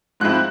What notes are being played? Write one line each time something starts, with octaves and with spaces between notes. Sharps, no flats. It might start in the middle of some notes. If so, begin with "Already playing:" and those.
G#2 F3 G#3 C4 E4 F#6